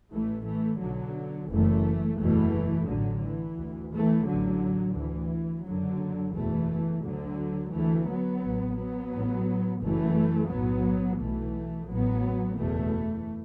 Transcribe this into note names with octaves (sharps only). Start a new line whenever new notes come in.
A1 A2 E3 A3
E3 A3
B1 B2 D3 F#3
F#1 F#2 E3 A3
F#1 E2 B2 E3 A3
A1 A2 D3 F#3
E3
D2
E3 A3
A1 A2 D3 F#3
D2 E3
F#1 F#2 D3 F#3
F#1 E2 B2 E3 A3
D2 D3 F#3
D2 E3 A3
F#3 B3
A1 A2
F#3 B3
A1 A2
F#1 F#2 E3 A3
B1 A2 F#3 B3
B1 B2 E3 A3
A1 A2 F#3 B3
F#1 E2 B2 E3 A3